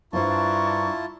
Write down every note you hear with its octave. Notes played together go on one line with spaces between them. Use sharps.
G2 D4 E4 F4 C5 A5 A#5 C#6